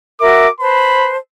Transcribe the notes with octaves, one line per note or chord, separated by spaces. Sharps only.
F#4 A#4 E5 D6
B4 C5 A5 B5